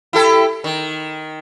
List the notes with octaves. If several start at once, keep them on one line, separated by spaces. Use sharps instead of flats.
E4 G4 A4
D#3